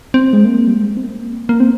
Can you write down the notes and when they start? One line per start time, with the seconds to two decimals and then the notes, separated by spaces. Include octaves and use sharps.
0.14 C4
0.33 G#3
0.45 A#3
0.67 G3
0.74 G#3
0.97 C4
1.04 A#3
1.49 A#3
1.60 C4